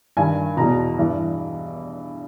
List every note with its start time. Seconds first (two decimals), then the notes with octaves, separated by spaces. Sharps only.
0.17 G2 D#3 G#5
0.57 E2 B2 A#5
0.98 G2 E3